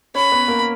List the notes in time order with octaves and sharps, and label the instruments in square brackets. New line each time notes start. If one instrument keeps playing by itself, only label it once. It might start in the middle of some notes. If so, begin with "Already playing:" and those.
[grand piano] C#4 C#5 [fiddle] B5
[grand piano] B3 B4
A#3 A#4